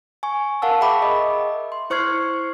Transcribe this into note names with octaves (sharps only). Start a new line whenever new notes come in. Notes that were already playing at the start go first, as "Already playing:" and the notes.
G#5 C#6
A#4 F5 F#5 A5 E6
G#4 E5 G5 B5 C#6 D6
G#4 A#4 D#5 E5
C6
E4 C5 C#6 F6 G#6 C7